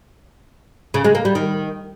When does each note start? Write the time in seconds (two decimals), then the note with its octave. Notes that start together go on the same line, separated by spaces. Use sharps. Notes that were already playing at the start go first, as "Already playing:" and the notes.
0.94 C#3
1.04 G#3
1.15 A#3
1.25 G3
1.35 D#3